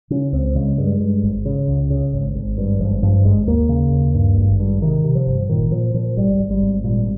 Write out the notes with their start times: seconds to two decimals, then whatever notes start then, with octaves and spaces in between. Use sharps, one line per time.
0.10 C#3 C#4
0.33 C#2 C4
0.55 C#3 G#3
0.78 G2 G#3
1.00 G2
1.23 G#1
1.45 C#3
1.68 C#2
1.90 C#3
2.13 G#1
2.35 G#1
2.58 G2
2.80 G#1 F3
3.02 G2 F3
3.25 G#1 G#3
3.47 D#2 A#3
3.69 C#3
3.92 D#2
4.15 G2
4.38 G#1
4.60 G2
4.82 C3 D#3
5.04 C3
5.15 F3
5.27 G1
5.49 A#2 D#3
5.71 A#2 F3
5.94 A#2 F3
6.17 G#1 G3
6.39 G#1
6.51 G3
6.62 G#1
6.84 A#2 G3